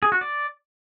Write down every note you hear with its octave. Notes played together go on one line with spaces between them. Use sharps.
G#4
F#4
D5